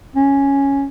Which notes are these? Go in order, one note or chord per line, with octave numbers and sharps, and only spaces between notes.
C#4